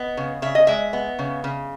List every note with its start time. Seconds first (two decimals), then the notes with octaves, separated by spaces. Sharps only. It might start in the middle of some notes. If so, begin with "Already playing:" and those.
Already playing: B3 D#5
0.17 C#3
0.42 C#3 E5
0.55 D#5
0.67 G#3 E5
0.93 B3
1.19 C#3
1.44 C#3